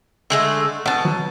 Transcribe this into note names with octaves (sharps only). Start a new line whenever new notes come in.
D3 G#3 A3
B2 F#5 A5
F#3